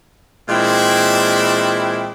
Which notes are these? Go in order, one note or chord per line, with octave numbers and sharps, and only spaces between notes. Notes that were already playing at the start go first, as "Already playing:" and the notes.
A#2 E3 G#3 C4 D4 E4